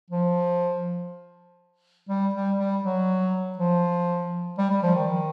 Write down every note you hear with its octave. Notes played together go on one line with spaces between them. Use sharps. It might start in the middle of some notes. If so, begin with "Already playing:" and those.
F3
G3
G3
G3
F#3
F3
G3
G3
F3
D#3